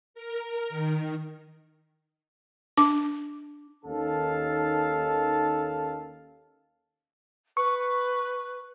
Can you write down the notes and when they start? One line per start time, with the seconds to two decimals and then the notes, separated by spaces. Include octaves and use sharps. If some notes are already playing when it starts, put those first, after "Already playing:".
0.14 A#4
0.70 D#3
2.77 D4 D6
3.84 D#2 D#3 C#4 A4 F5 A5
7.57 B4 C#6